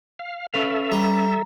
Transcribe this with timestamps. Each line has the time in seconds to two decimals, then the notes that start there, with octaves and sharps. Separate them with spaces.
0.19 F5
0.54 C#4 A4 B4 E5 F5
0.92 G3 A#5